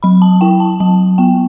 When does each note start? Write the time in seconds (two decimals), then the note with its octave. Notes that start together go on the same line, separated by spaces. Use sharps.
0.03 F#3 B5
0.22 A5
0.41 E4 G5
0.60 A5
0.80 F#3 A5
1.18 B3 G5